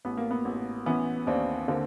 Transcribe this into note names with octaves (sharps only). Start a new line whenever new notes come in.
A1 B3
A#3
B3
A1
E3 B3 C#4
D#2 C4 D4
D3 A#3 C4